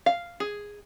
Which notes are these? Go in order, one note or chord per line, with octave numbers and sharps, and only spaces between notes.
F5
G#4